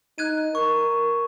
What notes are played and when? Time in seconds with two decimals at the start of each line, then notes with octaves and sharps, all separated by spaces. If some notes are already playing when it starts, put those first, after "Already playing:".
0.18 D#4 F#6 G#6 D#7
0.55 A#4 C#6